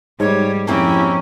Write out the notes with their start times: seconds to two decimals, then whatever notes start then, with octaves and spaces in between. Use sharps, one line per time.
0.20 G#2 G3 C#5
0.67 F2 A#3 C4 C#4 E4 G4